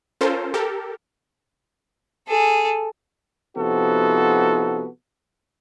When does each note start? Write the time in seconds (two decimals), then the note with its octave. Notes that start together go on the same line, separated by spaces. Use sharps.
0.21 C#4 F4 A4 A#4 C5
0.54 G4 A4 A#4
2.28 G#4 A4
3.56 C3 F3 B3 D#4 F#4 A4